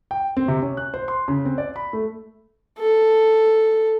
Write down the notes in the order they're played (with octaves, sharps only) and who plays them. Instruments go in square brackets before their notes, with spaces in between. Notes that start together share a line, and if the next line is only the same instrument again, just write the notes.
[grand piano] G5
C4
C3
C#4
F#6
C5
C6
C#3
C4
D5
B5
A3
[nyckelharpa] A4